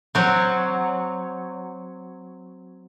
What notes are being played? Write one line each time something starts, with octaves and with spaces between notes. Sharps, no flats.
F#3 C4